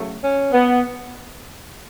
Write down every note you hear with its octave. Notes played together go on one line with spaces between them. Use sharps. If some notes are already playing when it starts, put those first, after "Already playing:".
Already playing: F#2 C#3 F#3 A3
C#4
B3